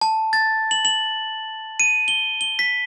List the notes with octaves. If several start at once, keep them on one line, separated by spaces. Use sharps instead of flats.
A5
A6
F#7
F#7
D#7
G7
G7
B6